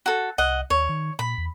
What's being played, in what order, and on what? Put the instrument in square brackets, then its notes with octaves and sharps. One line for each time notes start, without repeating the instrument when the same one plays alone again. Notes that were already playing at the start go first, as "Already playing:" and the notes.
[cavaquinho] F#4 A4
[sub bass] C2 [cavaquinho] D#5 F#5
[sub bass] D#2 [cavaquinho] C#5
[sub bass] D#3
[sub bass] A#2 [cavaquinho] B5
[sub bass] E2